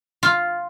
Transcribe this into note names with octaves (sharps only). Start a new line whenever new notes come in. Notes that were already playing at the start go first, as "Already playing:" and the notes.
F4